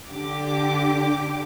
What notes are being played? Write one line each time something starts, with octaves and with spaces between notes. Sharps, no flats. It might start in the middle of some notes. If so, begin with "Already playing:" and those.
D3 G4 D6